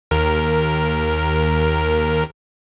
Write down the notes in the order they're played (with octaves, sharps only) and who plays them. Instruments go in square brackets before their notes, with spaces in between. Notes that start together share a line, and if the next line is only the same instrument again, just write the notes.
[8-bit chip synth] D#2 A#4